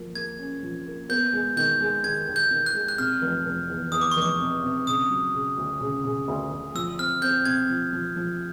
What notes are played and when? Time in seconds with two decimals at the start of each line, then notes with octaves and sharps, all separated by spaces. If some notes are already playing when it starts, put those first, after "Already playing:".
Already playing: F3 A#3
0.15 A#3 G#6
0.39 C#4
0.63 F3
0.86 A#3
1.09 B3 G6
1.33 G#3
1.57 D#3 G6
1.81 G#3
2.04 D#2 G#6
2.27 D#2
2.36 G6
2.51 D#3
2.66 F#6
2.74 G#3
2.88 F#6
2.98 C3 F6
3.22 F1
3.46 F1
3.69 E2
3.92 E2 D#6
4.01 D6
4.12 C#6
4.16 F1
4.22 D6
4.40 C3
4.63 C3
4.87 C#3 D#6
5.10 F#3
5.34 C#3
5.58 D2
5.80 C#3
6.04 C#3
6.28 D2
6.51 D2
6.75 F3 E6
6.98 C4 F6
7.22 C4 G6
7.45 C3 G#6
7.69 F3
7.93 F3
8.16 F3